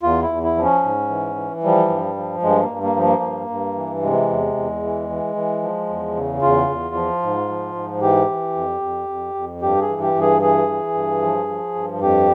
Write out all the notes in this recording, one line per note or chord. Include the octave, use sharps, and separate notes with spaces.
E2 F4
E4
E2
E4
F3
C#4
G#2
E3
E3
F3 G3
G2
F3
G2 G#3
A#3
G2
A#3
F3
A#3
G2
G2
E3
C3 G#3
E2
E2
E3
E3
E3
F3
E2
C#3
E2 F4
E2
F3
G#2
F3
G#2
E3 G4
E3
F2
F2
F2
F2
G2 G4
G#4
E3
G4
G2
G#4
E3 G#4
E3
G2
F3
F3
G2
F2 G4